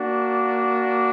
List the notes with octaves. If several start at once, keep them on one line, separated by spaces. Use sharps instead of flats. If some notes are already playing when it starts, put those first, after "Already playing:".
Already playing: A#3 D4 F#4